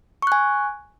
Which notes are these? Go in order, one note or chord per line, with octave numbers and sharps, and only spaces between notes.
G#5 C#6 F#6